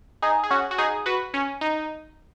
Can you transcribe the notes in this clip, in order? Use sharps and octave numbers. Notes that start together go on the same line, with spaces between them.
D#4 G#4
G#4
C#4 F#4
F#4
D#4 G#4
F#4 B4
C#4
D#4